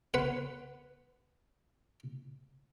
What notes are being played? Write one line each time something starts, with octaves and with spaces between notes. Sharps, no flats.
B4 F#5